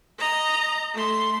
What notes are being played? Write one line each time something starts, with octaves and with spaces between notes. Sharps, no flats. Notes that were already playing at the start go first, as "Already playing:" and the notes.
D#5 A#5
A3 C6